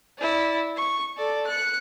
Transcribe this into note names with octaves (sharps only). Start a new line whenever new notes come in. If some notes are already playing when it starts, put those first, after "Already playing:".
E4 D5
C#6
A4 D5
F#6 C#7